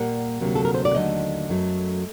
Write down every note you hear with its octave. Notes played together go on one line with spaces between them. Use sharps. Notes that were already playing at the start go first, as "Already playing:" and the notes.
Already playing: A#2 G3 A#3 F#5
D2 C3 F#3 A#3
A4
A#4
C5
D5
D#2 D3 F#3 A3 D#5
F#2 F#3 A3